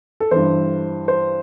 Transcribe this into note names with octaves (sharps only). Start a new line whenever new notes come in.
A4
G2 E3 C5
C5